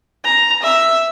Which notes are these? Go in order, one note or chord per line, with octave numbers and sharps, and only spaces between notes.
A#5
E5